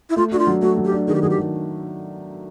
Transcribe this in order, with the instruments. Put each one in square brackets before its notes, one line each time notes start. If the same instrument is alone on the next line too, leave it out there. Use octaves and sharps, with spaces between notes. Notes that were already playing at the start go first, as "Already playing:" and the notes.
[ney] E4
[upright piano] A3 [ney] F4
[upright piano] D4 [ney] F#4
[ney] F4
[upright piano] F#3
[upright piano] A3 [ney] F#4
[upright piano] F#3
[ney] G4
[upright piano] D4
[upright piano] D#3 [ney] G#4
[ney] G4
[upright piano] F#3 [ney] G#4
[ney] G4
[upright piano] F#3